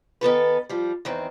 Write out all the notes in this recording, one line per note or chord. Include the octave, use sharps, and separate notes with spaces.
D#3 B3 A4 B4
F3 G3
E2 D#3 C4